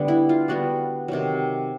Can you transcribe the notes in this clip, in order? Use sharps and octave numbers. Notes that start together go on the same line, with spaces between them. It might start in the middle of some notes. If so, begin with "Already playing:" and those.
Already playing: D3 G3 A3 B3 D4
E4
F4
D3 G3 B3 D4 F#4
C3 D#3 F#3